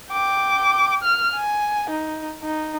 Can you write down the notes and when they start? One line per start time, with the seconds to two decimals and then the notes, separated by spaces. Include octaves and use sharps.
0.11 G5 D6
1.03 F6
1.34 G#5
1.90 D#4
2.43 D#4